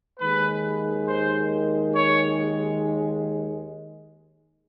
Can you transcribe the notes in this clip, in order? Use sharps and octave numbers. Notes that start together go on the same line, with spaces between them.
D#2 D#3 G#3 B4
C5
C#5